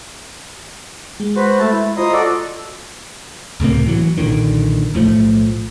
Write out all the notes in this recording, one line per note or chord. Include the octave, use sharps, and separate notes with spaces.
G#3
F#4 B4 C5
A3 A5
E4
F4 C5 D#5 A#5 C6 D#6
F#4 A4 D5
C#2 A2 C3 A#3
E3 F#3
B1 A#2 D3 D#3
B1 A2 F3 A3